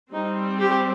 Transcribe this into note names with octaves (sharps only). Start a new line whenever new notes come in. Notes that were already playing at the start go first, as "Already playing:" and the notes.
G3 C4 D#4
G4